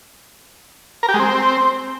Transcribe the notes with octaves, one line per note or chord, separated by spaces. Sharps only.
A#4
G4
G#3
C4